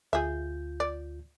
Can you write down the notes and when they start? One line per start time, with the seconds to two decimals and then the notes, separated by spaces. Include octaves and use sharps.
0.13 D2 F4 G#4 E5 G6
0.80 D5